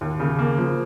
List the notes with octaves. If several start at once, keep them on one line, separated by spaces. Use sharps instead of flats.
D#2
C#3
A#3
F3